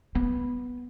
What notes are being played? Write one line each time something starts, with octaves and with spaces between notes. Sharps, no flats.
B3